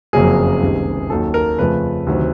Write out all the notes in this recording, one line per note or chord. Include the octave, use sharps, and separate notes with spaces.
F#1 F2 C#3 F#3 A#3 G#4
C#2 C3 D#3 G3
D#2 D#3 F#3 A4
A#4
F2 C#3 F3 A3 B4
D2 C3 D#3 F#3